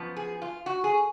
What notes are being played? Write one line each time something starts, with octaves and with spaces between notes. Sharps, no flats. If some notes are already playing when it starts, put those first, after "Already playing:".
Already playing: F#2 F3 B3
G#4
F4
F#4
G#4